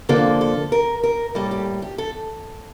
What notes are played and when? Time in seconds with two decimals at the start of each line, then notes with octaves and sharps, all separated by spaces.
0.09 F2 D3 F3 A#3 A4
0.41 A4
0.72 A#4
1.03 A#4
1.35 A2 G3 A#3 A4
1.51 G4
1.82 G4
1.98 A4